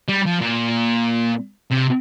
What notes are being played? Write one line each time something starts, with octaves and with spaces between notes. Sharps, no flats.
G3
F3
A#2
C3